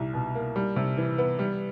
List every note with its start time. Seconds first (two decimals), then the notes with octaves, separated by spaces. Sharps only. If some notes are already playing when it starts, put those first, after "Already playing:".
Already playing: C2 G3
0.14 B2
0.35 A#3
0.56 G3
0.76 C3
0.97 E3
1.18 B3
1.39 G3